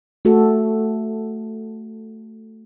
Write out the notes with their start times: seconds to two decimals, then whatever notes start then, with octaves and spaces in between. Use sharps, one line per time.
0.25 A3 F#4 A4